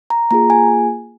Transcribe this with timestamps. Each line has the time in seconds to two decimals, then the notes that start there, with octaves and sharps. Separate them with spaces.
0.10 A#5
0.31 A#3 F4 G#4 A#5
0.50 G#5